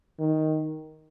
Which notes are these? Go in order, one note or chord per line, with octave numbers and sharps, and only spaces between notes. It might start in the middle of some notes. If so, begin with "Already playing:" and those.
D#3